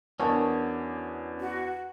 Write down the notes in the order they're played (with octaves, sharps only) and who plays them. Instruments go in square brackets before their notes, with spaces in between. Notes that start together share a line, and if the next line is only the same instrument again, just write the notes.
[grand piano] E2 D4 [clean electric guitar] C#4 F#4 G#4 [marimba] A#4 A5 C#6
[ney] F#4